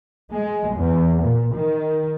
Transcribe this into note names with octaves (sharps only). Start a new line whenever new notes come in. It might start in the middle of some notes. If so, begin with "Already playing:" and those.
G#3
E2
A#2
D#3